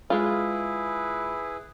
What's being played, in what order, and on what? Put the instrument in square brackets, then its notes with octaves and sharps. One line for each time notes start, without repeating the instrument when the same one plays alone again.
[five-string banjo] G#3 F4 [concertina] E4 G#4 B4